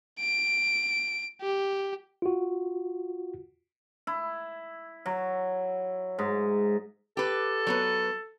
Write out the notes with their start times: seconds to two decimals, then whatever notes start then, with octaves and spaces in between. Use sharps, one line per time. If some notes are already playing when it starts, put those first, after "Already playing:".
0.20 D7
1.42 G4
2.22 F4 F#4
4.07 E4
5.06 F#3
6.19 G#2
7.17 G4 A4 B4
7.67 F#3 B3 B4